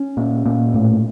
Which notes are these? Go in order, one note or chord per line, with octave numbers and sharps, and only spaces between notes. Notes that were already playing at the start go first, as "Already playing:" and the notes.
Already playing: C#4
A#2
A#2
A2